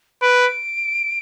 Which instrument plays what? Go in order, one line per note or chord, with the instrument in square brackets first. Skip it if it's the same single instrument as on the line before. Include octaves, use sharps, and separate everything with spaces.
[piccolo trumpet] B4 [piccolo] D7